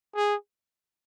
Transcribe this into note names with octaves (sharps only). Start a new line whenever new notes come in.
G#4